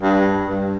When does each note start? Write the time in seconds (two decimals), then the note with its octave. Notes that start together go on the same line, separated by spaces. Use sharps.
0.02 G2
0.45 G2